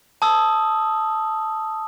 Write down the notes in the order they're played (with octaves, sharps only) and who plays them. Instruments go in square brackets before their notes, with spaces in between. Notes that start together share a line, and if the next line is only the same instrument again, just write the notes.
[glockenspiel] A5 D#6 E6